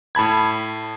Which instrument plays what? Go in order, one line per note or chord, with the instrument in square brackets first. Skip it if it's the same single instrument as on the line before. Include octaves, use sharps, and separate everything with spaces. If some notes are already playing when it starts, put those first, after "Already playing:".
[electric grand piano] A2 A5 B5 G#6